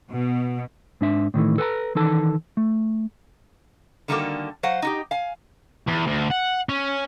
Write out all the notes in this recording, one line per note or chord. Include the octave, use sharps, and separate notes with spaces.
B2
G#2 D4 E5
A2 D#3 E3 A3
A4 B4 G#5 A#5
D#3 E3 D#4 A4 A5
A3
D3 D#3 G3 A#3 F#4 A4
F#3 C5 F5 F#5
D#4 F#4 G4
F5 G#5
E2
D2
F#5
C#4